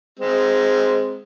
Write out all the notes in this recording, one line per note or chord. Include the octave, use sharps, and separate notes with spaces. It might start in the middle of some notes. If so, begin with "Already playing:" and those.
G#3 C4